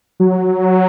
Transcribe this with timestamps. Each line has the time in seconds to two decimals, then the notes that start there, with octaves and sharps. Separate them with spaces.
0.20 F#3